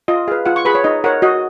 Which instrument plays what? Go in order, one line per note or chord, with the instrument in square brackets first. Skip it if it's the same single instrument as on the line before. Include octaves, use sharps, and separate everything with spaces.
[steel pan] F4 D#5
G#4 B4 F5
F4 F#5
C#6
G#4 B4 B5
C#5
D#4 D#5
A#4 C#5 F#5
F#4 D#5